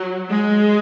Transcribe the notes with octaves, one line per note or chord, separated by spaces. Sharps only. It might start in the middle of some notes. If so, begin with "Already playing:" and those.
Already playing: F#3
G#3